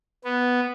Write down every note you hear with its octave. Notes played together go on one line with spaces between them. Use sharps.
B3